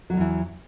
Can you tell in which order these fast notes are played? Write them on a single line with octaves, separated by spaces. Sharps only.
F#3 G#2 E2 E3